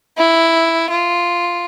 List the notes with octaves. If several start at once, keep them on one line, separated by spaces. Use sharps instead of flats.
E4
F4